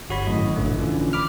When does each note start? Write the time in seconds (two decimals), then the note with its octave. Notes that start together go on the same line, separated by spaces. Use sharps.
0.10 G1 F#4 C#5 B5
0.27 G#1 F#2 A2 D#5
0.56 A#1 D3 A3
0.78 D3 E3 C#4 D4 F4
1.13 B5 D6 F6